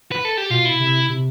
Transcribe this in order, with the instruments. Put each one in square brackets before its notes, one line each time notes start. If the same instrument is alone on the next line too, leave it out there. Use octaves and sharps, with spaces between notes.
[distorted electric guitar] B4
A4
G4
[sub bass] B2 [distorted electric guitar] F4
[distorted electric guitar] E4
[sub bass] C3
C3